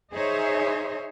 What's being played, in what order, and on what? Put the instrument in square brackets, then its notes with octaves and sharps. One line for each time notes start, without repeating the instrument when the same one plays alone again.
[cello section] D#4 G#4 C5 C#5 E5